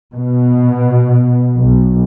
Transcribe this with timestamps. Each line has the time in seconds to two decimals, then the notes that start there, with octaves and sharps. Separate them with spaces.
0.14 B2
1.58 B1